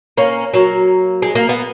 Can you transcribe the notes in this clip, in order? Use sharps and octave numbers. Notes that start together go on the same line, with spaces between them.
A#3 C#4
F#3 A#3
G#3
A#3
B3